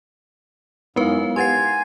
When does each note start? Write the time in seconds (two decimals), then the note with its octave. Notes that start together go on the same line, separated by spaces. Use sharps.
0.96 F#2 G#3 B3 D#4 E4 A#4 B4 F5
1.36 G4 B4 F#5 G#5 C6 A6 C7